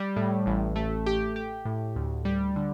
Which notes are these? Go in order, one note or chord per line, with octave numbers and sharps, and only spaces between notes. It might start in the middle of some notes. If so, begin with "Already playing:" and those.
Already playing: G3
A2
A1
A3
G4
G4
A2
D2
G3
D3